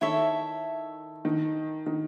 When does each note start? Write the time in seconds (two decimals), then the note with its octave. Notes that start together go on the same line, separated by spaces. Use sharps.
0.01 D#3 E4 A4 C#5 E5
1.25 D#3
1.86 D#3